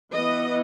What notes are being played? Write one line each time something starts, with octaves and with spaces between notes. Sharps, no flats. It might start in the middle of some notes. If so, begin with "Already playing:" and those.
E3 B3 D#5